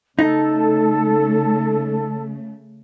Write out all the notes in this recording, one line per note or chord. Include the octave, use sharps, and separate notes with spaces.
C#3 A3 D#4 A4